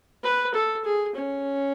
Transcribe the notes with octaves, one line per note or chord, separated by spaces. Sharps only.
B4
A4
G#4
C#4